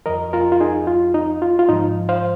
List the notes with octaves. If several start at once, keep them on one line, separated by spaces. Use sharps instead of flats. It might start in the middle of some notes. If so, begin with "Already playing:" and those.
F2 F3 A#4 D#5
F4 A#4
F4
D#4 G#4
F4
D#4
F4
F4
G#2 F3 D#4
C5 F5